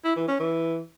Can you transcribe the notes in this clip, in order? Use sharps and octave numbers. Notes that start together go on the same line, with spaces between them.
E4
E3
C#4
E3